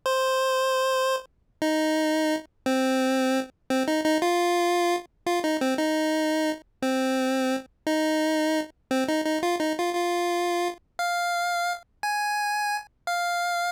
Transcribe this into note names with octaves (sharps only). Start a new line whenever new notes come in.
C5
D#4
C4
C4
D#4
D#4
F4
F4
D#4
C4
D#4
C4
D#4
C4
D#4
D#4
F4
D#4
F4
F4
F5
G#5
F5